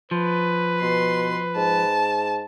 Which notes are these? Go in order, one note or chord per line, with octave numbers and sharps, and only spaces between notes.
F3 B4
B2 C6
G#2 A5